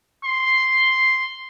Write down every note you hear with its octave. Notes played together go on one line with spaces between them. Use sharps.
C6